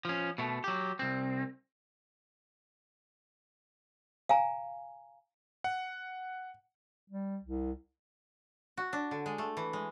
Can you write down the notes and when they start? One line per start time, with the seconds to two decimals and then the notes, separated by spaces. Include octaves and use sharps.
0.05 F3 C#4
0.38 B2 A3
0.64 F#3 G4
0.99 C2 C4
4.29 F5 G#5 A#5
5.64 F#5
7.10 G3
7.43 C2
8.77 F#4
8.93 D4
9.11 D3
9.26 G#3
9.38 A3
9.57 E3
9.73 G#3